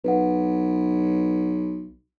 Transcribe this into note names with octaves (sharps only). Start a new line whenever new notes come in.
B1 B4 F#5